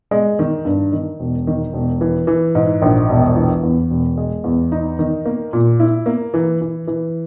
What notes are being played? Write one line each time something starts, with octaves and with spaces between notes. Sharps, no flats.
G#3
D#3
G2
D#3
E1
D#3
E1
E3
E3
G#2
A#1
E1
E3
E2
E1
G#3
E2
D#4
D#3
A#3
A#2
E4
A#3
E3
E3
E3